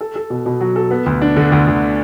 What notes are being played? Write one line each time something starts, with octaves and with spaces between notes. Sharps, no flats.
A4
A4
B2
B2
F#3
A4
B3
D2
D4
D3
D2
D2